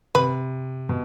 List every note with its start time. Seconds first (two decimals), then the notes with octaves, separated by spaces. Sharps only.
0.15 C3 B4
0.89 B2